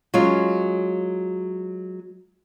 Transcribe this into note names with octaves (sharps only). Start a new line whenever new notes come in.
F#3 G#3 C#4 F4